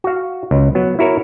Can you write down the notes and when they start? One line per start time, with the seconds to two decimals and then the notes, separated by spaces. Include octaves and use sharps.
0.04 F#4 F5
0.51 C#2
0.75 F#3 B3
0.99 E4 F#4 A#4 C#5